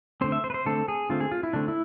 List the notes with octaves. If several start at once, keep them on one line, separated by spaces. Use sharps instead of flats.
D3 A3 C4 C5
E5
C5
B4
C5
D3 A3 C4 A4
G#4
D3 A3 C4 F4
G#4
F4
E4
D3 A3 C4 D4
E4